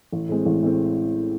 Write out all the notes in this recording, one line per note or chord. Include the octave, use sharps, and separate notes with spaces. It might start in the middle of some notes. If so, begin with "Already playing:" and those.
A1
A2 G#3 C4
A1
A2 G#3 C4